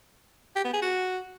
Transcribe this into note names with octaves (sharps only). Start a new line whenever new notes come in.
G4
B3
G#4
F#4